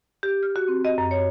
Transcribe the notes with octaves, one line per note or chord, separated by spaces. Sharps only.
G4
F6
F#4
C4
D#5
F#2
C#5